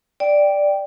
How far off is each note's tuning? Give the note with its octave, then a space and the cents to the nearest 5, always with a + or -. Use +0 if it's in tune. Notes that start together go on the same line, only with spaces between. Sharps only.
D5 +0 G5 +0